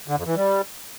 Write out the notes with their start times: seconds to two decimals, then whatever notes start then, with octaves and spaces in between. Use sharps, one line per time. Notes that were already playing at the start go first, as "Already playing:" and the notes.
0.08 D3
0.17 F2
0.26 E3
0.35 G3